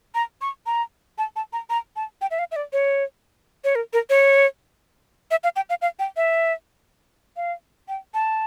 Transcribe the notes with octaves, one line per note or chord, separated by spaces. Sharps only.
A#5
C#6
A#5
A5
A5
A#5
A#5
A5
G5
E5
F5
E5
D5
C#5
C#5
A#4
A#4
C#5
E5
F5
G5
F5
F5
G5
E5
F5
G5
A5